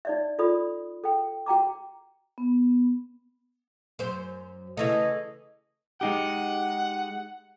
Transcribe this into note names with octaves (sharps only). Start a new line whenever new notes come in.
D#4 D5 E5
F4 A4 D5 B5 D#6
A4 G5
F#4 G5 A#5 D6
B3
F#2 C5
C#3 E3 A3 D#5
G#3 D#4 G4 F#5